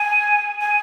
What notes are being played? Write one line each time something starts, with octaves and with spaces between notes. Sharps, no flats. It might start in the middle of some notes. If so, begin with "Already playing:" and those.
Already playing: G#5
G#5